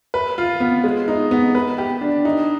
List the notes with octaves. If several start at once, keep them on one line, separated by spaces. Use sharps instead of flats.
B4
F4
B3
G#3
D#4
B3
B4
G4
D4
D#4